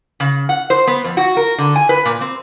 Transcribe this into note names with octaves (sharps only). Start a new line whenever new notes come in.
C#3
F#5
C5
B3
F2
F#4
A#4
D3
G#5
B4
A#2
C4